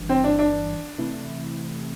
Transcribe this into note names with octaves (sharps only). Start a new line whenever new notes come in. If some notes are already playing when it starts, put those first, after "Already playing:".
Already playing: G1 G2 E3
C4
D4
D4
C3 E3 A3 C4 E4